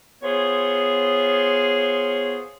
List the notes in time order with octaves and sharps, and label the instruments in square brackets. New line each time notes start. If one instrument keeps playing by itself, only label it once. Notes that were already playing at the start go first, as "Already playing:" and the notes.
[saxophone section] B3 F4 G#4 C5 C#5